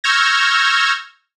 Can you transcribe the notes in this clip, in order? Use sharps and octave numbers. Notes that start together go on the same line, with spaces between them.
C#6 E6 F6 G6 G#6 A#6